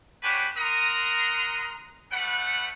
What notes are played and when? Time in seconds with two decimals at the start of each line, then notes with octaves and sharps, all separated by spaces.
0.23 C#4 D4 F#4 G4 B4
0.57 A#4 F#5 A#5 C6 D#6
2.12 G3 A3 B4 F#5